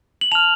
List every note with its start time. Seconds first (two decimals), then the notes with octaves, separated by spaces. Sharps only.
0.21 F#7
0.32 A5 F6 F7